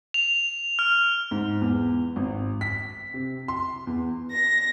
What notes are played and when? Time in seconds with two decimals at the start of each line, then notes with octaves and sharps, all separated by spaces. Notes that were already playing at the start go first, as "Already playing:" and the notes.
0.14 F7
0.79 F6
1.31 G#2
1.61 E2
2.16 G#1
2.61 B6
3.14 C3
3.48 C6
3.87 E2
4.32 A#6